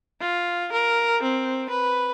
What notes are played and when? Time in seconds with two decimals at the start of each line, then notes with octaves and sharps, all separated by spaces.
0.21 F4
0.72 A#4
1.23 C4
1.70 B4